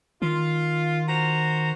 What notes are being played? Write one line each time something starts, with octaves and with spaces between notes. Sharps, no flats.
D#3 F4
F#4 C5 A#5